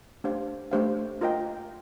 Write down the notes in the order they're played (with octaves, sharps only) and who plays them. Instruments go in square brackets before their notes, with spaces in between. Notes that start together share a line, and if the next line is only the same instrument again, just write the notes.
[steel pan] A3 D4 G4 C5 F5
A3 D4 G4 C5 F5
F4 A#4 D#5 G5